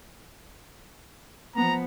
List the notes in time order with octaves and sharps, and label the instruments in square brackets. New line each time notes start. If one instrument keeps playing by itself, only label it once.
[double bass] F3 B3 [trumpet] A#5